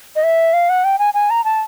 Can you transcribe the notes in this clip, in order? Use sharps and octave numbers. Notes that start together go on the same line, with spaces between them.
D#5
E5
F5
F#5
G5
G#5
G#5
A#5
A5